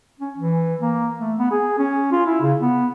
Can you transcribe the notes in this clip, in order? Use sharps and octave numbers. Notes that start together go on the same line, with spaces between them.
C#4
E3
A#3
A3
B3
G#4
C#4
F4
E4
C#3
B3